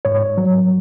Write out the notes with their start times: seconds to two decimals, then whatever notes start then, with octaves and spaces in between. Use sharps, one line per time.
0.05 G#2 C#5
0.37 F#3